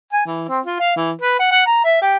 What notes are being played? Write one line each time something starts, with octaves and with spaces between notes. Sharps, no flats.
G#5
E3
C4
F4
F5
E3
B4
F#5
F#5
A#5
E5
G4